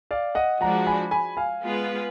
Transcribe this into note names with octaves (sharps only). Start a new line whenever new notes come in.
D5 F5
D#5 F#5
F3 G#3 D4 F#4 F#5 A#5
G#5 B5
G#5 B5
F5 G#5
G#3 B3 F4 B4